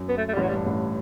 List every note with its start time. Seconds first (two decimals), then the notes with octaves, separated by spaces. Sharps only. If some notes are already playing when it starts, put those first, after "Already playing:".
Already playing: F#2
0.09 B3
0.17 A3
0.28 A3
0.34 G3
0.37 A1 A2 F#3
0.48 G3
0.54 G2
0.66 A1 A2